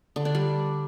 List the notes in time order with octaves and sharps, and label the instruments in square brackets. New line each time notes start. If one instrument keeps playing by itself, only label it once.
[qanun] D3
D4
G3